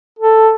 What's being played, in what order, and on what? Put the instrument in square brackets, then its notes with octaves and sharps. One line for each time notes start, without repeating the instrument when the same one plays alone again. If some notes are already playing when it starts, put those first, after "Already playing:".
[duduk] A4